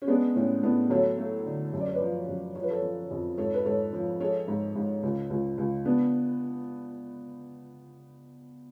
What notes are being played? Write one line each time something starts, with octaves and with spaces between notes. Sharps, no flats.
C#4
G#3 B3 D4
A2 C#4
A2 B3 D4
F#3 A4 C#5
A3
D3
F#2
D5
C#5
B4 D5
F3
F#2
F3 C#5
B4
A4 C#5
F3
F2
G#2 A4 C#5
B4
G#2 A4 C#5
F3
G#3 A4 C#5
G#2
G#2
C#2
C#2
C#2
C#2 B3 D4